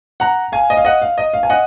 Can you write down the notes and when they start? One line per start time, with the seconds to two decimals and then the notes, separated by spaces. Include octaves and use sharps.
0.20 F#5 A#5
0.52 F5 G#5
0.70 D#5
0.77 F5
0.85 D#5 F#5
1.02 F5
1.18 D#5
1.34 F5
1.43 G#5
1.50 D#5 F#5